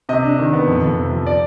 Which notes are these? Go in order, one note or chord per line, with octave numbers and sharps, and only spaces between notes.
C3 D#5
D4
D#3
B3
F2
F2
C3
F3
D5